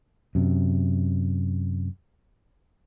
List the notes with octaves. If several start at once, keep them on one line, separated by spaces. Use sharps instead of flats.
F#2 C3